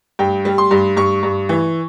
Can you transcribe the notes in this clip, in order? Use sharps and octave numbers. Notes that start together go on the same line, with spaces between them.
G2 G5
G3
C6
G2
G2 C#6
G2
E3